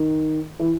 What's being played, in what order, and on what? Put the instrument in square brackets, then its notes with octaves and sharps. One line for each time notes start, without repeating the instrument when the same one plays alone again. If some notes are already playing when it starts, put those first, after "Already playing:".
Already playing: [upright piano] D#3
E3